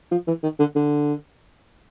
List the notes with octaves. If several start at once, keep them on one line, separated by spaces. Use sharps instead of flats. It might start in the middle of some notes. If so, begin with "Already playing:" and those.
F3
E3
D#3
D3
D3